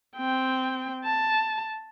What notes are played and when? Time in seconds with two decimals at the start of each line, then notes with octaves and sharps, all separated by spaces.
0.17 C4 G5
1.04 A5